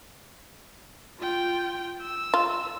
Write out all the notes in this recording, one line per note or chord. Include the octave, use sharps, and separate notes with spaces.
F4 G5
E6
F4